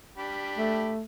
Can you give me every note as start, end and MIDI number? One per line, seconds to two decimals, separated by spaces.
0.18 0.92 62
0.18 0.92 67
0.18 0.92 83
0.58 1.03 57